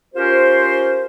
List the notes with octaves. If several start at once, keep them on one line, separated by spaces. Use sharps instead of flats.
C#4 F4 G4 A#4 C5